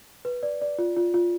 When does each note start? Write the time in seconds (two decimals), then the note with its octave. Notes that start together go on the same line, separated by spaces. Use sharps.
0.25 B4
0.43 D5
0.61 D5
0.79 F4
0.96 F4
1.14 F4